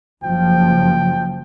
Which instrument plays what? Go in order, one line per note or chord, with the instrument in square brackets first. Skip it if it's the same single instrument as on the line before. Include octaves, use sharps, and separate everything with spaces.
[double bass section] F#1 F3 [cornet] G5